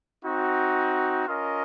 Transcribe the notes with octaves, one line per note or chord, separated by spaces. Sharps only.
C4 D#4 F#4
C#4 F4 A#4 D#5